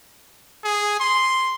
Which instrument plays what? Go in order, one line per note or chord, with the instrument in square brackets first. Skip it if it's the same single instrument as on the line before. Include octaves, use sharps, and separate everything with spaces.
[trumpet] G#4
C6